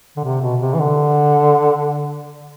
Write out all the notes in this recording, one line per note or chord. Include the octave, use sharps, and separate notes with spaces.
D3
C3
B2
C3
E3
D3